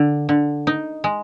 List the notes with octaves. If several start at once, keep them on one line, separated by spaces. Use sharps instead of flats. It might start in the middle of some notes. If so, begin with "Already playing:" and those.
Already playing: D3
D3
D#4
G#3